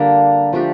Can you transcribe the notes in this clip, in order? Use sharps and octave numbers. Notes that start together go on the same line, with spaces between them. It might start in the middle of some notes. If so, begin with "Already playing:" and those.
Already playing: D3 G3 A#3 D4
F3 A3 D4 G4